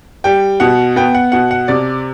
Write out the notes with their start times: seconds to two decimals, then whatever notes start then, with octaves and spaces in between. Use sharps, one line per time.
0.24 G3 G5
0.60 B2 F#5
0.96 B3 G5
1.15 F#5
1.32 B2 F#5
1.51 F#5
1.68 C3 D5